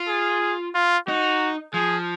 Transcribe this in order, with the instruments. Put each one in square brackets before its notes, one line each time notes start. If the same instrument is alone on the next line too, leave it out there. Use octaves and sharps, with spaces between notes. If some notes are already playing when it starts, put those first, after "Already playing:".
Already playing: [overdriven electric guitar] F4
[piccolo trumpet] G#4
F4
[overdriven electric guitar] D#4 [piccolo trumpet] F#4
[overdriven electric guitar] F3 [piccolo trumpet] G#4